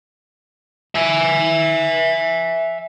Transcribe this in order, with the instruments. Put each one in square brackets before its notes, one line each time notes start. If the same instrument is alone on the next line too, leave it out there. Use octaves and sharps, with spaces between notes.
[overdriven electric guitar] E5 G#5